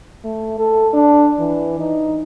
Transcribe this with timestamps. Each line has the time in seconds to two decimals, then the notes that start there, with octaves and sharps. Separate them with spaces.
0.24 A3
0.59 A4
0.94 D4
1.39 E3
1.80 D#4